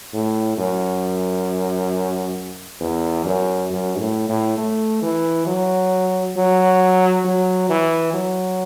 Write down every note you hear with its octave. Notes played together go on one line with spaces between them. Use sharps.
A2
F#2
E2
F#2
F#2
A2
A2
A3
E3
F#3
F#3
F#3
E3
F#3